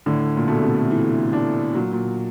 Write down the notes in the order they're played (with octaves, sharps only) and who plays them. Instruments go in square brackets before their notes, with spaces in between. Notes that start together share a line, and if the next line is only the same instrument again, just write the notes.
[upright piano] A2 [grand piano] D3
[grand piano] A#2
[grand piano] B2 [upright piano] A3
[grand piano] C3
[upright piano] E3
D4
[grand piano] A#2 [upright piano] F#3
[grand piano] A#2